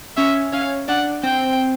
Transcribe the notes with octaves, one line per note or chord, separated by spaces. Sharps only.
C#4 C#5 E5
C#4 C#5 F5
D4 D5 F#5
C4 C5 G5